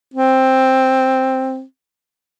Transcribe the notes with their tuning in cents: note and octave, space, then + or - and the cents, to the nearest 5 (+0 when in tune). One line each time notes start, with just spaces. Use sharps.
C4 +5